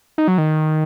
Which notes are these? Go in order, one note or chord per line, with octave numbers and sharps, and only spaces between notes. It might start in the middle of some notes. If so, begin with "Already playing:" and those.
D#4
F#3
D#3